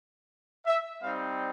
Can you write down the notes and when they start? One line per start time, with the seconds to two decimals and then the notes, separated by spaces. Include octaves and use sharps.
0.66 E5
1.02 G3 C4 D#4 F5